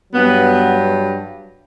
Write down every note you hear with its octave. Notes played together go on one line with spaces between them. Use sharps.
G2 F#3 B3